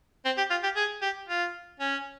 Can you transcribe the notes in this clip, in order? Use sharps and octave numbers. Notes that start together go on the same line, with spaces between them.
C4
G4
F4
G4
G#4
G4
F4
C#4